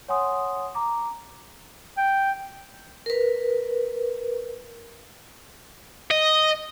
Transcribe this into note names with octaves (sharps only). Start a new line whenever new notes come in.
C#5 F#5 G#5 C6 D#6
A#5 D6
G5
A#4 B4
D#5